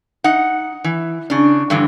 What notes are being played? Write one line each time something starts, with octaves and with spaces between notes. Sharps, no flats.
D#4 F#5
E3
C#3 D4
G2 D3 E3